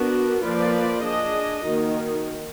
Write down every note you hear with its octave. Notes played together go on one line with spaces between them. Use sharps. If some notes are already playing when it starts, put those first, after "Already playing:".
Already playing: B3 D4 F#4 A#4
F3 A#3 F4 B4 D5
D4 G#4 D#5
D#3 A#3 D#4 F#4